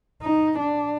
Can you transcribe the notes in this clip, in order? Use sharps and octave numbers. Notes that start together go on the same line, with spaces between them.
D#4
D4